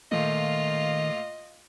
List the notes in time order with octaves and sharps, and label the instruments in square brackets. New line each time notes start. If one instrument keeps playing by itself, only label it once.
[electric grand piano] A#2 A3 [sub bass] D#3 [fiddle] F4 F5 [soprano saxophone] D#5